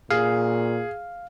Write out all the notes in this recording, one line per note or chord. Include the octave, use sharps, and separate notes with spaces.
A#2 G#4 F5